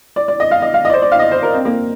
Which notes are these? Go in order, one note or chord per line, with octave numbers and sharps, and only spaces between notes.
D5
D5
D#5
F5
D#5
F5
D#5
D5
C5
D5
F5
D#5
C5
A#4
C4
A#3